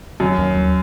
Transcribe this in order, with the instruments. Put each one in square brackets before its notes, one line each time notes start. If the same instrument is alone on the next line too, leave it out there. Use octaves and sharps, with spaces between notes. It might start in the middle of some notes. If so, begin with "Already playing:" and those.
[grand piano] F#2 [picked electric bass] D#3
[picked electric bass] D#2
F#3